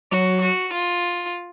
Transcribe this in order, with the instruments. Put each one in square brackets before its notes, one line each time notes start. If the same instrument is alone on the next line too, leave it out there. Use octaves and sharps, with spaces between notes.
[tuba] F#3 [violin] F#4
[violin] F#4
F4